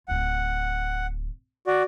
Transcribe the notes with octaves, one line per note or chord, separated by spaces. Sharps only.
D1 F4 F#5
F#4 D5